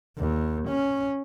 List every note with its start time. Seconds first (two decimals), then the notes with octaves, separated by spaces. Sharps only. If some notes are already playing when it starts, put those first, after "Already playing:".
0.18 D#2
0.68 C#4